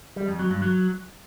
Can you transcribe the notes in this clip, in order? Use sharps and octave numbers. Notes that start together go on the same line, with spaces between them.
G3
F2
F#3
G2
F#3